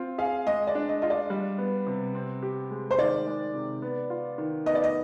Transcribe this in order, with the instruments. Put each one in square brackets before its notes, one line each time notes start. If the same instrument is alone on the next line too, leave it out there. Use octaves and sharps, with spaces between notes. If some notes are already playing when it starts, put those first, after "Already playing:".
Already playing: [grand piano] C4 F4
[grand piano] G#4 [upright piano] F5
[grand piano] G#3 [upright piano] D#5
[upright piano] D5
[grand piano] D4
[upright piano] D#5
[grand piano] F4 [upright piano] D#5
[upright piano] D5
[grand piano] G3
B3
C3
C4
G4
G#3
[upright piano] C5
[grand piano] D#3 [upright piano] D5
[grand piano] G#3
C3
B3
F4
D#3
[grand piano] B3 [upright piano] D#5
[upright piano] D5
D#5